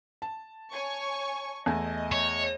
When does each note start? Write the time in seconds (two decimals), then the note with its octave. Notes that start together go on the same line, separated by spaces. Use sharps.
0.22 A5
0.71 C#5 G#5 C#6
1.66 E2 A3 D#5 G#5
2.12 C#5